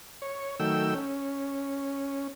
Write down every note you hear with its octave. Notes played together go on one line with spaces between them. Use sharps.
C#5
D#3 F#3 A3 G5 E6
C#4